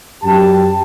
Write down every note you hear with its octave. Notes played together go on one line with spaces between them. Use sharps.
F#2 G4 A5